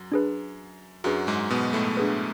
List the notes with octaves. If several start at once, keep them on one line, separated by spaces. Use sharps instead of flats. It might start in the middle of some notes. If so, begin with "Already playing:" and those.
Already playing: F#2 F#3
D4 G#4 B4
F#2 F#3 D4 G#4 B4
G#2 G#3
B2 B3
A2 A3
D4 G#4 B4